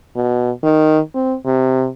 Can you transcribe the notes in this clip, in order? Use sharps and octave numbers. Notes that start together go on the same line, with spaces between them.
B2
D#3
C4
C3